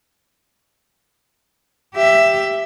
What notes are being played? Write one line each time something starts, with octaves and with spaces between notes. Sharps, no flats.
G4 E5